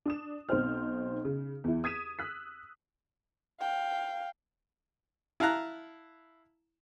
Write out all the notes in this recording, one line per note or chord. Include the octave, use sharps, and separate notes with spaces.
D4 D#6 E7
B1 C4 D#4 C5 F6
C#3
E2 E4
D#6 G#6 B6 D#7 E7
E6 F#6 B6
F5 G5
E4 F5 A5 A#5 F#6